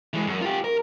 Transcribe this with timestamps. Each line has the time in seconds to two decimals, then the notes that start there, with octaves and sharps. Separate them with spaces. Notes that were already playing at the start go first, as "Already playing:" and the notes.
0.14 E3 G#3
0.27 F#2
0.42 F4 G4
0.64 A#4